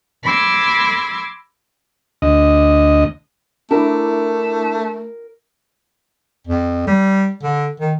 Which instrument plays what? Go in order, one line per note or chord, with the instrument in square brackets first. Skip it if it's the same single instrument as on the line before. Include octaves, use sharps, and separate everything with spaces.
[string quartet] B5 C6 D6 E6 G#6 A#6
[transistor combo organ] D2 D#5
[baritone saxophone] A3 [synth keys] D4 E4 [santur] A#4
[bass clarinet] F2
G3
D3
D#3